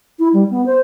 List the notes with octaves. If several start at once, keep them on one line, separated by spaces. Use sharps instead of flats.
E4
G3
B3
C5